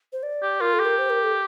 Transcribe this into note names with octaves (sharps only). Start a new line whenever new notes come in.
C5
D5
G4
F4 A#4
A4
G4
A#4
C5
A#4
A4